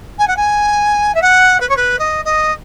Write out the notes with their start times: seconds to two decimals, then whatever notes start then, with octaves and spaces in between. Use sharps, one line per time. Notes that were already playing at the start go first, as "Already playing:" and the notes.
0.18 G#5
0.27 F#5
0.36 G#5
1.14 E5
1.22 F#5
1.60 B4
1.69 C#5
1.76 B4
1.99 D#5
2.25 D#5